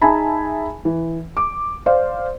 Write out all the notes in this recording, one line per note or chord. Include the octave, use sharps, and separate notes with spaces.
D#4 G#4 E5 G#5 A5 B5
E3
D6
C5 D5 F5